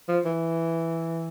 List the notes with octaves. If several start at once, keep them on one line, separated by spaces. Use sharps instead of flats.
F3
E3